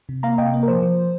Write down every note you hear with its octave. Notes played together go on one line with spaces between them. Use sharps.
C3
A#3 F5 A#5
C3 D#5 G5
A#3
A#4
F3 C5
F3